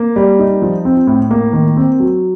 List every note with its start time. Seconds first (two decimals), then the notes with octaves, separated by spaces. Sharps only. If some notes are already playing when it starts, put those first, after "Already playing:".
Already playing: A#3
0.16 G3
0.39 D#4
0.62 F3
0.85 C4
1.07 A2
1.31 A#3
1.53 D#3
1.77 C4
2.00 F#3